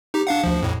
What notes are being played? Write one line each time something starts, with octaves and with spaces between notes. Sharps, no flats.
D#4 G4
D4 F5 F#5
D2 F3
F2 A2